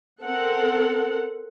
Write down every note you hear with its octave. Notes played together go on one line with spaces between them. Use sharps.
C4 A4 A#4 F#5